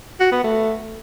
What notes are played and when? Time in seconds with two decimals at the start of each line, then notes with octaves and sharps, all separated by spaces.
0.20 F#4
0.32 B3
0.44 A3